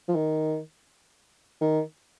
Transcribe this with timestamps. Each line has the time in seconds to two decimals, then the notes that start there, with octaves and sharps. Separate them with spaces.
0.09 F3
0.15 D#3
1.61 D#3